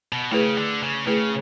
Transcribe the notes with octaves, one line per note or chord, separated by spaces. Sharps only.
B2
C#3 A3 E4 G#4 B4
D3
C#3
C#3 A3 E4 G#4 B4